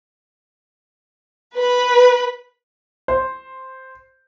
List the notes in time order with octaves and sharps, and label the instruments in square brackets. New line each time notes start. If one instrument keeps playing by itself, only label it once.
[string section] B4
[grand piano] C5